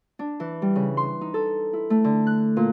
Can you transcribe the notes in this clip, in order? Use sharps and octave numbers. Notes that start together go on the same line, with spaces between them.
D4
E3
G3
C#3
C6
D#4
A4
E4
A3
D3
F#6
A#2